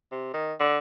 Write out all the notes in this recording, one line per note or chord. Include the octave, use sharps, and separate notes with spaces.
C3
D#3
D3